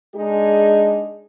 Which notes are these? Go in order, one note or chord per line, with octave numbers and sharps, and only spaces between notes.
G#3 D4 D#4 G#4